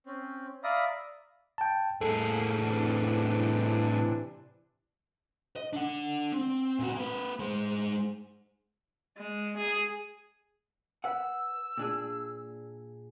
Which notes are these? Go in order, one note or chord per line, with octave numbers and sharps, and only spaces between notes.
C4 C#4
D5 E5 F5 A#5 B5 D#6
G5 A5
A2 A#3 G#4 A4
C3 E3 D4
D#5
D4 F#5
C4
A#2 F#4
A#3 B4
G#3 C5
G#3
G#4
B4 F#5 E6
A#2 D4 G#4